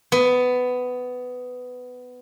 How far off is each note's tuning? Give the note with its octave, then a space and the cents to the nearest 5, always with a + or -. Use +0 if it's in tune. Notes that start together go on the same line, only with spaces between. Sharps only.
B3 +15